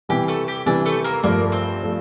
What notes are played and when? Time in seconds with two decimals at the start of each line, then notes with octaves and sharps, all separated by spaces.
0.09 C3 E3 G3 G4
0.28 A3 A4
0.48 G4
0.66 C3 E3 G3 D4
0.86 A3 A4
1.04 A#3 A#4
1.23 G2 F3 A3 A#3 A#4
1.52 C4 C5
1.83 F3 A3